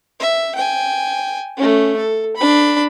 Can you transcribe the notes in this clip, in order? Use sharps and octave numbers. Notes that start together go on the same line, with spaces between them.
E5
G5 G#5
A3 C#4
A4
D4 B5